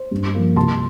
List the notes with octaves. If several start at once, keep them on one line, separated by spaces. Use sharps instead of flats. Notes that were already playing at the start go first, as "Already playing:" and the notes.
Already playing: C5
G2
F3 A#3
C2 A5 C6